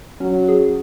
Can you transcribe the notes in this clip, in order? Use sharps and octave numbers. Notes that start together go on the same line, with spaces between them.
F#3 C#4
G#4